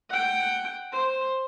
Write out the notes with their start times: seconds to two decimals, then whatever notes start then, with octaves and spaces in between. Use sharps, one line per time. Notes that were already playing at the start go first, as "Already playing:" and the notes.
0.10 F#5 G5
0.92 C5